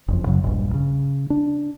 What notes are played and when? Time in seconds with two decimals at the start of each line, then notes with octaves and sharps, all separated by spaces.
0.08 F#1 F2
0.26 F#2 C#3 F#3
0.44 E1 A#1 G2
0.74 C#3
1.30 D4